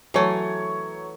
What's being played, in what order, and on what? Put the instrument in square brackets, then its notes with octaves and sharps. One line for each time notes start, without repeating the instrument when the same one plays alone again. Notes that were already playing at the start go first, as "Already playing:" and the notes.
[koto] E3 A3 [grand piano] F#3 C#5